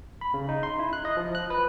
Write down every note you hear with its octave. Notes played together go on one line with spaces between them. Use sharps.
B5
C#3
D#4
C6
E4
F#6
D#5
F3
F#6
B4